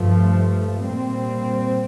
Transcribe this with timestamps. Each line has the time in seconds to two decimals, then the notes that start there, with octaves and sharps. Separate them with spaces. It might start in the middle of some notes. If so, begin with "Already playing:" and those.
Already playing: G2 F3 A3
0.77 A#2 G3 C4